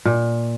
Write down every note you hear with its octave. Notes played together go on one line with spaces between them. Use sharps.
A#2